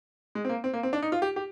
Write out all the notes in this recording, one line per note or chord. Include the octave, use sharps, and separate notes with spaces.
G#3
C4
A#3
C4
A#3
C4
D4
D#4
F4
G4
G4